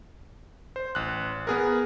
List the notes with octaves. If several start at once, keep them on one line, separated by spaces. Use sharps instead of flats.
C5
A1 F#6
B3 G#4 A#4